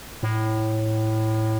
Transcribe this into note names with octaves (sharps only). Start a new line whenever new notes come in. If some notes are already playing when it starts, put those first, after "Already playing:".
A2